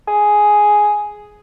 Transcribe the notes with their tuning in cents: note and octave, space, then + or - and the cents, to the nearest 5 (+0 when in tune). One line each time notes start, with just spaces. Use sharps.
G#4 +5